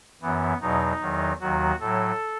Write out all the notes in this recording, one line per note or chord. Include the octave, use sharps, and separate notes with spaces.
F#2 E3 B3
E2 B2 F#3 D#4
E2 D#3 F#3
D#2 D#3 F#3 F#4
A2 F#3 A4